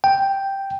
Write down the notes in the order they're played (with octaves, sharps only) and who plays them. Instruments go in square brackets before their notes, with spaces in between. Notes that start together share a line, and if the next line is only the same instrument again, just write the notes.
[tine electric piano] G5